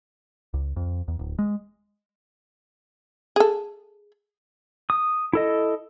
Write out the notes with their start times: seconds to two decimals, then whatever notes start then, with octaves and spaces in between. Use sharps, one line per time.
0.54 C#2
0.76 F2
1.08 E2
1.19 D1
1.39 G#3
3.36 G#4 A4
4.90 D#6
5.33 E4 A4 D#5